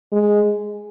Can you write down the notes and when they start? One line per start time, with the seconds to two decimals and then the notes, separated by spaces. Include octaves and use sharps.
0.12 G#3